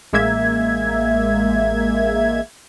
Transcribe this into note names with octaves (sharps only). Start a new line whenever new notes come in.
A1 G#3 A#3 E5 G#6